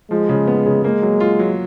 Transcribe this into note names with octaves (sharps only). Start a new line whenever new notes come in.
F3 G#3
C#3
B3
C#3
G#3 A#3
F#3
F4
F#3